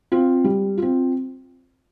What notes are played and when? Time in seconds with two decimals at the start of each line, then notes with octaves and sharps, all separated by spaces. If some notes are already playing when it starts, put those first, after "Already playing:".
0.12 C4 F4
0.44 G3
0.78 C4 F4